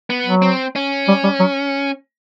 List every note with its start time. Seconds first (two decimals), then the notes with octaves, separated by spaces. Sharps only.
0.10 B3
0.26 F#3
0.42 C4
0.76 C#4
1.08 G3
1.24 G3
1.40 F#3